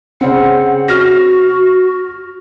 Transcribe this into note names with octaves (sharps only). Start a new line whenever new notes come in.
C#3 C4 F#5
F#4 F6 A#6